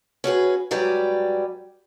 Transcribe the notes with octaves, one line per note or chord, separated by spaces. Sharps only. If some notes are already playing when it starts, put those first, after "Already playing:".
C#4 F#4 G#4 B4
G#2 F#3 G3 B4 D5